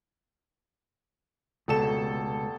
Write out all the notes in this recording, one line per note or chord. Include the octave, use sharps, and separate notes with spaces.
F1 C#2 B2 A4 E7